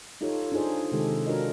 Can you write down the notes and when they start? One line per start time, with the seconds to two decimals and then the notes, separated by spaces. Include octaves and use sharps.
0.21 D#4 F4 G4 A4 C#5
0.52 D4 D#4 F4 G#4 C5
0.92 C3 D#3 G#3 G4 A4
1.27 D4 F4 F#4 A#4 C#5 D#5